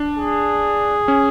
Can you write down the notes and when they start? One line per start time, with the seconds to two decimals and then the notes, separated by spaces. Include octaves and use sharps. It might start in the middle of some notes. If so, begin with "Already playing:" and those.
Already playing: D4
0.18 G#4
1.08 C#4